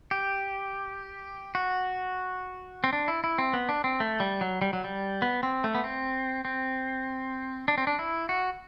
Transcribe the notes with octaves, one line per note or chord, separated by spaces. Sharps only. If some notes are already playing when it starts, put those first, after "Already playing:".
G4
F#4
C4
D4
E4
E4
C4
B3
D4
C4
A3
G3
F#3
G3
F#3
G3
B3
C4
A3
B3
C4
C4
D4
C4
D4
E4
F#4